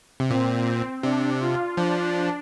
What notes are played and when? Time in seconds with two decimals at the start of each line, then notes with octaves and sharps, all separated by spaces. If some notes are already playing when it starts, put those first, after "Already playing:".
0.20 C3
0.30 A#2 C4
1.03 C3 D4
1.41 F4
1.77 F3 D4